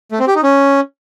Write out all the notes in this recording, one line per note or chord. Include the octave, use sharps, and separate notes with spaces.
A3
C4
G4
D#4
C#4